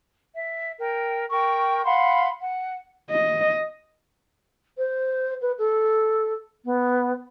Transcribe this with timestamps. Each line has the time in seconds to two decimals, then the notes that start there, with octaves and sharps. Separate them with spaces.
0.35 E5
0.79 A#4 G5
1.30 A#4 G5 C#6
1.85 F5 F#5 B5 C6
2.40 F#5
3.11 D#5
4.77 C5
5.41 B4
5.58 A4
6.64 B3